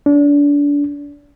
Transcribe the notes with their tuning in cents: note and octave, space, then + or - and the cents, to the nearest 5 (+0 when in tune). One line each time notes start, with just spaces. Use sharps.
D4 -30